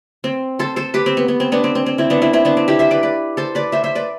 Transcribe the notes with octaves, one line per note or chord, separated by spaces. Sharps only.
C4
A4 C5
A4 C5
G4 B4
C4
B3
B3
C4
B3 D4
C4
C4
C4
C4 E4
B3 D4
C4 E4
C4 E4
B3 D4
C4
E4 G4
C5 E5
B4 D5
B4 D5
A4 C5
B4 D5
C5 E5
C5 E5
B4 D5